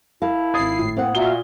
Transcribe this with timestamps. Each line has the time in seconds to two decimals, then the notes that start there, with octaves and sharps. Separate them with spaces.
0.22 E4 A#4 F5 A5
0.54 G#1 D#6 G#6 A6 C7
0.79 A2
0.97 A#3 C4 F#5
1.15 A#2 F#4 E5 F5 A#5 G7